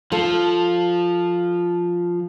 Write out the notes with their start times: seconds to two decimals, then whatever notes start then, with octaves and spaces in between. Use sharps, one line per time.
0.12 F3 F4 A4